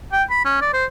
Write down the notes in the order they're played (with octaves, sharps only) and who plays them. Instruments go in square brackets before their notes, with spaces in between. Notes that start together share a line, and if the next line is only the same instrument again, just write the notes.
[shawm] G5
B5
C#4
D5
C5